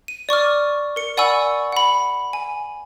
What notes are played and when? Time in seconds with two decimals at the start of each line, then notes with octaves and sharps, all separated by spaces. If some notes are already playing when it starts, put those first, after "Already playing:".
0.08 D#7
0.29 D5 C#6 D6 F6
0.96 A#4 C#7
1.17 D5 F#5 G#5 B5 C#6 E6
1.72 F#5 B5
2.33 G#5